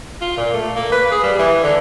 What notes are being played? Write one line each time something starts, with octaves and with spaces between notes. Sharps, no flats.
F4
A#2
A3
A#3
B4
G#4
G3
E3
D3